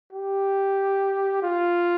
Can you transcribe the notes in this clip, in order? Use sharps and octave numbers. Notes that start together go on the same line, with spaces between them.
G4
F4